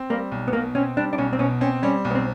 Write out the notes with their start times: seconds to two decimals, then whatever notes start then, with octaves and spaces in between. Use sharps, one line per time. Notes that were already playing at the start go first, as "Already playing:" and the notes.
Already playing: C4
0.10 G3 A#3
0.32 B1
0.48 B3
0.53 B2 A#3
0.75 C4 C#4
0.97 G3 D4
1.13 D4
1.18 B1 C#4
1.33 C4
1.39 B2 C#4
1.61 C4 C#4
1.83 G3 C#4
2.05 B1
2.11 B3
2.15 C4